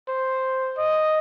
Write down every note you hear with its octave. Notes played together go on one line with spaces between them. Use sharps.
C5
D#5